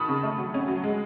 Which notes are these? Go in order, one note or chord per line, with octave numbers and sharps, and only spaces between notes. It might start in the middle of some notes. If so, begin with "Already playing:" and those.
Already playing: D#3 A5 B5 C#6 D#6
C#3
A3
F#3
C#4
F#3
G#3